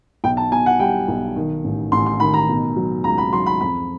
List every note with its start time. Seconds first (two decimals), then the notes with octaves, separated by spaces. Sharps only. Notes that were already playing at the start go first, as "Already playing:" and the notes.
0.24 B1 G5
0.37 A5
0.51 B2 G#5
0.66 F#5
0.80 G3 G5
1.08 B1
1.36 D#3
1.64 A1
1.92 A1 C6
2.06 C6
2.20 D#3 B5
2.34 A#5
2.48 B2
2.76 F#3
3.04 C#2 A#5
3.18 B5
3.33 F#3 C6
3.46 B5
3.61 F2 B5